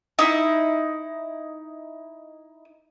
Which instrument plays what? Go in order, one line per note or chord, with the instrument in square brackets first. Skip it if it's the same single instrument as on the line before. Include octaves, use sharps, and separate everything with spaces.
[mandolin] D#4 E4